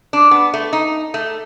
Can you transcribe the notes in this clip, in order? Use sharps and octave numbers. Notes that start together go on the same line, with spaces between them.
D4
B3
A3
D#4
A3